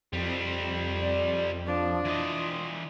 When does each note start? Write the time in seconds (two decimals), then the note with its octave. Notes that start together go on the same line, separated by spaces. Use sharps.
0.13 F2 G3 C4
1.00 D5
1.66 F3 D4
2.05 E3 F4 D#5